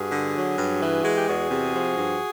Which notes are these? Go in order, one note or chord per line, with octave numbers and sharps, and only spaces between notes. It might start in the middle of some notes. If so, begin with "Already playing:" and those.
Already playing: G2 F#4 G#4
D3
F#3
G2
E3
G#3 F#4
G4
E2 F#4 G#4
C3
F3
G2